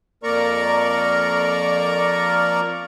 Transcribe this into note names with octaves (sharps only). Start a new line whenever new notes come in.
F2 A#3 A#4 D5 A#5 C#6